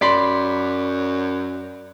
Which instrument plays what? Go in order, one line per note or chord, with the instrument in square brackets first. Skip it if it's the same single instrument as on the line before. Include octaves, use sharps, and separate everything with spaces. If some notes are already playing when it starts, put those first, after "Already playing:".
[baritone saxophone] F#2 [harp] D5 B5 C6